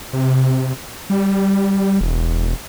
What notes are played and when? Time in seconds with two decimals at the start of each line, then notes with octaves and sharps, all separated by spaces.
0.13 C3
1.10 G3
2.01 E1